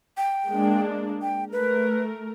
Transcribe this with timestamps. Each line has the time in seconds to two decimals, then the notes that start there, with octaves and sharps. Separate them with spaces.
0.17 G5
0.50 G#3 A#3 D4
1.22 G5
1.52 A3 A#4 B4